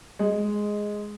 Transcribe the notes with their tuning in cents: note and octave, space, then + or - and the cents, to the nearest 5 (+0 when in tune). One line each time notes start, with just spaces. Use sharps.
G#3 +0